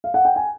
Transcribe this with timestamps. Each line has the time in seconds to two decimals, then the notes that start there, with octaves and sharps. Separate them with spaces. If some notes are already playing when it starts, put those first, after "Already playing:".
0.04 F5
0.14 F#5
0.25 G5
0.36 G#5